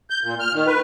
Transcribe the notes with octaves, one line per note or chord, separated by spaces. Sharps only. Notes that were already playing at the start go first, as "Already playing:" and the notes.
G6
A#2
F6
D#3
B4